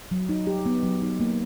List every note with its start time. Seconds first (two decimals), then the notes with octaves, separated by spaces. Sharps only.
0.11 F#3
0.29 D#4
0.47 G4
0.66 B3
0.83 F#3
1.02 D#4
1.20 A#3